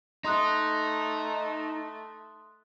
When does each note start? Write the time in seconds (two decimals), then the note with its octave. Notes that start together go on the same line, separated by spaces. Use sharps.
0.24 A3 D#4 C6 D#6 F#6